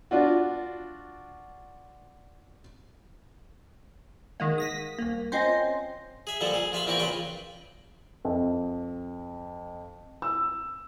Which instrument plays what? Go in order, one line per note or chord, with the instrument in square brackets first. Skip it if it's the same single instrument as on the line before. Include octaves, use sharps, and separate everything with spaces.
[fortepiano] D4 F4 F#4
[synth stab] D#3 G#3 A#3 [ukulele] F#5
[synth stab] D#6 A#6 B6
C2 A#3
[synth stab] C4 C#4 C5 [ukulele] F4 D#5 G#5
[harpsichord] G#4 E5
A#2 D3 F3 G3 A4
G#4
A#1 F4 E5 F5 B5
E2 A#2 A#3 C4 D5 C#6
A#1 C#3 F4 B4 G5
[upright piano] F2
E6